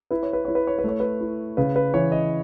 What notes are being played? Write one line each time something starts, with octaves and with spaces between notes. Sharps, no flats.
E4 B4
C#5
B4
E4 C#5
B4
C#5
B4
A3 C#5
B4
E4
C#3 B4
B4
E3 C#5
D#5